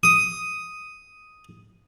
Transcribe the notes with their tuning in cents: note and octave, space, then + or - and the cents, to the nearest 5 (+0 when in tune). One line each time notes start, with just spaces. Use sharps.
D#6 +5